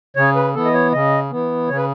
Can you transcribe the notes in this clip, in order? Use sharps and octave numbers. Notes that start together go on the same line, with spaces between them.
C#3 C#5
B4
E3 B3 A4
D#5
C#5
C#3 D#5
E3 B3
C#3 C#5
B4